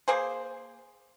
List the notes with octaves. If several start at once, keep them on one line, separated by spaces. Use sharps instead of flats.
A#3 G#4 C5